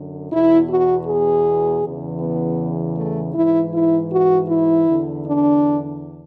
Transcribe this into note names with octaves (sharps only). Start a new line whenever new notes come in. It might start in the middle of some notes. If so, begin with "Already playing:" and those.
Already playing: F#2 D3
E2 B2 E4
F#4
G#4
E2 C#3 E3
B3
A3
G#2 E3 E4
E4
F#4
E4
E2 D3
D4